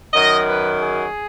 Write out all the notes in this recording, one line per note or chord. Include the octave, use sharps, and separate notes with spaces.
F#2 D#3 F#3 D#5
B4
G#4